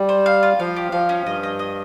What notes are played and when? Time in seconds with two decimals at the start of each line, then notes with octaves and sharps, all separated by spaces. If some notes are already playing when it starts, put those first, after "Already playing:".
Already playing: G3
0.09 C5
0.26 F5
0.43 F4
0.60 F3 F5
0.76 G4
0.92 F3 F5
1.09 C#4
1.25 G2 D#5
1.43 D#5
1.59 D#5